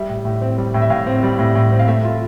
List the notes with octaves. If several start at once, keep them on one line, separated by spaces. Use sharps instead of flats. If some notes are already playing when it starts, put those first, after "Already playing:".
Already playing: G3 E5
A2
A2
C4
G3
A2
E5
A2 F5
C4
G3
A2
A2
C4
F5
A3 E5
F4